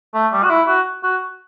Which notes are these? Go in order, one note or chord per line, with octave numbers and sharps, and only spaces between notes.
A3
G3
F#4
E4
F#4
F#4